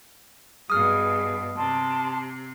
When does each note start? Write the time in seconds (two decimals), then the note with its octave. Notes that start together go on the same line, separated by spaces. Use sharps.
0.70 G2 B2 G#4 D#6 F6
1.56 C3 A5 C6 D6